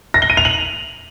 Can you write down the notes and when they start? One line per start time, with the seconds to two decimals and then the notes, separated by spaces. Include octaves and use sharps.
0.14 A#6
0.22 G7
0.30 D#7
0.37 F7
0.45 F#7